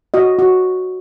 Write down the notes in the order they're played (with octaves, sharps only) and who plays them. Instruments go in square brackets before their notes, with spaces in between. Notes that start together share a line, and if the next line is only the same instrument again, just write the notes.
[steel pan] F#4 D#5
F#4